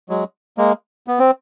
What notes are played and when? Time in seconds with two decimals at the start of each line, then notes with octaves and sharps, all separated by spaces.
0.09 F#3 G#3
0.58 G#3 A#3
1.07 B3
1.19 C4